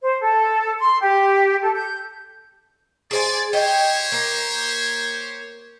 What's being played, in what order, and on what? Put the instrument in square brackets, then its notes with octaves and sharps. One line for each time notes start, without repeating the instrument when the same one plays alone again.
[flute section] C5
A4
C6
G4
A4
G6
[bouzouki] G#4 C5 G#5 [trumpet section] D5
[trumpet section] G4 C5 C#5 [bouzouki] D#5 G5
[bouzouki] A#3